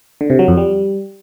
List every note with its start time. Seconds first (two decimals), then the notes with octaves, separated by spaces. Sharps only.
0.21 D3
0.30 C3
0.39 F#3
0.48 F2
0.57 G3